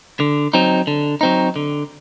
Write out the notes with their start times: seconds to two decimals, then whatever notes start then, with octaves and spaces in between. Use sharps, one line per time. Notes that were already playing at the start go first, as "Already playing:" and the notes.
0.20 D3
0.54 F#3 C4 D#4
0.87 D3
1.21 F#3 C4 D#4
1.56 D3